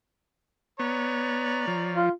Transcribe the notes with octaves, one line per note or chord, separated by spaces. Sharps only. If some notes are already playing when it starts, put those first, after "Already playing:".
B3 C#5 D5 A#5
F3
F4